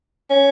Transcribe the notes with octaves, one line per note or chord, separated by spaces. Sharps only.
C#4